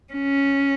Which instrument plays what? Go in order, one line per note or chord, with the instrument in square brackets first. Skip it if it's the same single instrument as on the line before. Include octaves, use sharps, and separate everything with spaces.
[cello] C#4